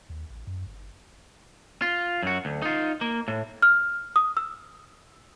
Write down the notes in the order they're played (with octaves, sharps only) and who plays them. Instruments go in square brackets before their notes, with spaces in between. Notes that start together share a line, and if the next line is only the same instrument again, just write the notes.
[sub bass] D#2
A1
F#2
G1
[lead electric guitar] F4
F#2 F#4
D2
D#4 F4
A#3
A2
[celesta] F6
D#6
E6